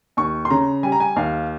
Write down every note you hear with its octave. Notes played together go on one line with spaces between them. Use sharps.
D#2 C#6
C6
C#3 A#5
G3 G#5
A#5
G#5
D#2 F5